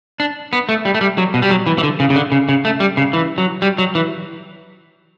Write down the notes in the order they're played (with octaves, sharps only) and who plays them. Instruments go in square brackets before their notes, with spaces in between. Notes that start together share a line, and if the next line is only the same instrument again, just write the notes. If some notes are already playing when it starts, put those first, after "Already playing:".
[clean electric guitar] D4
B3
A3
G3
A3
G3
F#3
B2
G3
F#3
E3
E3
D3
C#3
C#3
D3
C#3
C#3
A3
G3
C#3
E3
F#3
G3
F#3
E3